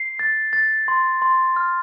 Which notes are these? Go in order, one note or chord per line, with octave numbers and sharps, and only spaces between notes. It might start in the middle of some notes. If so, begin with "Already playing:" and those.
Already playing: C7
A6
A6
C6
C6
F6